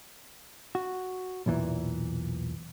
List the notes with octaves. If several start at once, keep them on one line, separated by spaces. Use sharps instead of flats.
F#4
B1 E2 A#2 E3